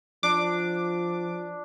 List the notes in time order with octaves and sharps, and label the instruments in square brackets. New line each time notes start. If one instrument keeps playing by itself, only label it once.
[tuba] F3 [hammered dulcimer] D4 [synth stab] D6